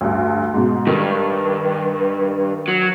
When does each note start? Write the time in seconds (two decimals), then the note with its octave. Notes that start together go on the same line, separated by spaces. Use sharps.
0.01 D2 G2
0.54 G#2 B2
0.87 G2 D#3
2.68 F#3